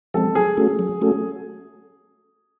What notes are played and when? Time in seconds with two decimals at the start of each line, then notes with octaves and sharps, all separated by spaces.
0.14 F3 G#3 C4 A4
0.35 F#3 G#4
0.57 A3 C#4 F#4 A4
0.79 F#3
1.01 A3 C#4 F#4 A4